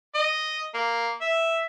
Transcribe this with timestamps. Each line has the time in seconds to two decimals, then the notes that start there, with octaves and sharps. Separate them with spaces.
0.15 D#5
0.74 A#3
1.21 E5